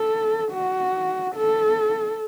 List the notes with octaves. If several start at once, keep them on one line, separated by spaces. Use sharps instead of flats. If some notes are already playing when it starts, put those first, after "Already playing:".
Already playing: A4
F#4
A4